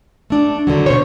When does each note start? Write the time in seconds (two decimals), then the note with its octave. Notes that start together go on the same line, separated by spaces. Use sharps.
0.30 A3 D4
0.67 D3 D#3 F#3
0.86 B2 C5 C#5